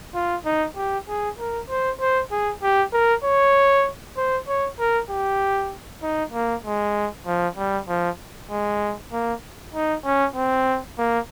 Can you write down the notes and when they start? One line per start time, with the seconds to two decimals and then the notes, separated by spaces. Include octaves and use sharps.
0.14 F4
0.45 D#4
0.76 G4
1.08 G#4
1.38 A#4
1.69 C5
2.00 C5
2.31 G#4
2.62 G4
2.92 A#4
3.24 C#5
4.17 C5
4.48 C#5
4.79 A#4
5.10 G4
6.02 D#4
6.33 A#3
6.65 G#3
7.26 F3
7.57 G3
7.88 F3
8.50 G#3
9.12 A#3
9.74 D#4
10.04 C#4
10.36 C4
10.98 A#3